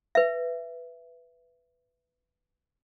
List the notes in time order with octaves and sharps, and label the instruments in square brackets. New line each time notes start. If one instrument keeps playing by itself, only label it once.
[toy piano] B4 E5